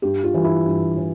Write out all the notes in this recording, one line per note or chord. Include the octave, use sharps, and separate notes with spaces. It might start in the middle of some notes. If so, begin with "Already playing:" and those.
G2 G4
F4
E3 G3
E4
G2
E3